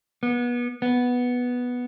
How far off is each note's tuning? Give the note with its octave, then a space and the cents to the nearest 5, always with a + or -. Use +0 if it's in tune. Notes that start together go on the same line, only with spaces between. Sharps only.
B3 -30
B3 -5